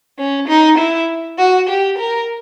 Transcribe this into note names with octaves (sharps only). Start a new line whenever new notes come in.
C#4
D#4
E4
F#4
G4
A#4